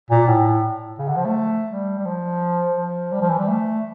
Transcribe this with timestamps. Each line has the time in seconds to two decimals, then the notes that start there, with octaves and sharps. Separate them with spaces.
0.11 A#2
0.27 A2
0.99 C#3
1.08 D3
1.16 F3
1.25 A3
1.70 G3
1.99 G3
2.05 F3
2.77 F3
3.12 G3
3.22 F3
3.29 E3
3.38 G3
3.48 A3